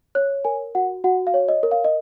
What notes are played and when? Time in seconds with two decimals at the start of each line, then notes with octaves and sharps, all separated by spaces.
0.15 C#5 F#6
0.45 A#4 G#5
0.75 F#4 F#5
1.04 F#4 F#5
1.27 F5
1.34 C#5
1.49 D#5
1.63 A#4
1.71 F5
1.85 D#5